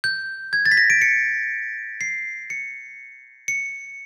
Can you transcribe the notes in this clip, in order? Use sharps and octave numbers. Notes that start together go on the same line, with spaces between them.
G6
G#6
A6
B6
A#6
D7
C#7
C7
C#7
C#7